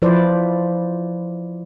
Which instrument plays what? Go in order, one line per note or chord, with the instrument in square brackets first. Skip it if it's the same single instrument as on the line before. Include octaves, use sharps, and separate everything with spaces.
[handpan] F3 E4 B4 C5 D5